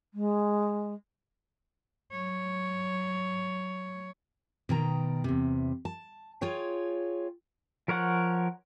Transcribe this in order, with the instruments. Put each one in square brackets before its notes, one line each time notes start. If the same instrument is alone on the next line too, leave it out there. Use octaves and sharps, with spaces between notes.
[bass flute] G#3
[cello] F#3 C#5
[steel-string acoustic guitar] B2 D#3 G5 A#5
E2 C3
A5
F4 G#4 C#5 G5
[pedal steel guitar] F3 A#4 C#5 F#5